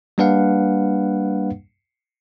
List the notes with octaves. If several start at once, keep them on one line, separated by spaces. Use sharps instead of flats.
G3 A#3 D4 B4 F5 F#5